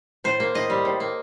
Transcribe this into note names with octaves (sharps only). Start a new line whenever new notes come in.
A2 C5
A#3
A2 D#5
G3
A2
A#3